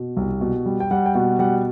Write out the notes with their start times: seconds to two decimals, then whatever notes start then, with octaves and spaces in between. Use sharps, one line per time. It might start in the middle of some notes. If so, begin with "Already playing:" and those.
Already playing: B2
0.17 C2
0.41 B2
0.66 G3
0.80 G5
0.91 G3 F#5
1.06 G5
1.14 B2 F#5
1.39 G3 F#5